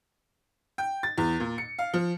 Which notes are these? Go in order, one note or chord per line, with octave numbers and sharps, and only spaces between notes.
G5
A6
E2
A#2
C#7
F5
F3